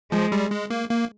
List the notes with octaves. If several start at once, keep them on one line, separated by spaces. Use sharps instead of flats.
F3 G#3
G3
G#3
A#3
A#3